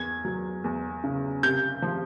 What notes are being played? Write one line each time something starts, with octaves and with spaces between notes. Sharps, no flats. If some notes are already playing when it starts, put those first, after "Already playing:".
Already playing: E2 G#6
F#3
E2
C#3
C3 G6
F3